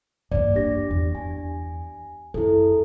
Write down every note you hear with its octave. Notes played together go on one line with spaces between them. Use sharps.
G2 A#3 D5
D4 G4 A#6
E2
G#5
F#2 E4 G#4 A4